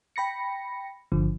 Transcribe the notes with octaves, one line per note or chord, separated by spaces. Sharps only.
G5 B5 A#6 C#7
G1 D3 F3